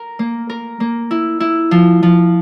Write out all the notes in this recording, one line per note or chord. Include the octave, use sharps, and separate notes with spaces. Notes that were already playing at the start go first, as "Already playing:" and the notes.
Already playing: A#4
A#3
A#4
A#3
E4
E4
F3
F3